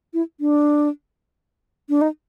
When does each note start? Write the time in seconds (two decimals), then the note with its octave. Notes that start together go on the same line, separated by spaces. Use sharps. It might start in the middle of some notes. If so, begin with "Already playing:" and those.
0.14 E4
0.40 D4
1.89 D4
2.01 D#4